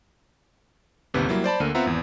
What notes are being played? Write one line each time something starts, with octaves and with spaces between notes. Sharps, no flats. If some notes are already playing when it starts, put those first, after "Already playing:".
G1 D#2 C3 B4
F#3 G3 A#3 E4
C5 D5 A5 B5
D2 D3 A#3 A#4 D#7
B3 C4 F4 E5 F#5 A#5
G#1 E2